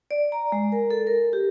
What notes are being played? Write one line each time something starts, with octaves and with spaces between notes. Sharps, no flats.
D5
A#5
G#3
A#4
A4
A#4
G4